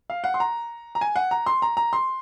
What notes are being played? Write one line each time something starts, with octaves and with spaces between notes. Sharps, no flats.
F5
F#5
C6
A#5
A#5
G#5
F#5
A#5
C6
A#5
A#5
C6